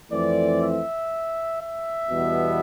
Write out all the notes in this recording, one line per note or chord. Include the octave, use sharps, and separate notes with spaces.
F2 E3 A3 C4 D5
E5
E5
E2 B2 G3 B3